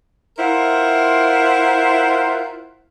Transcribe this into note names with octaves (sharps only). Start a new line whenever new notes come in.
E4 F4 A#4 C5 F#5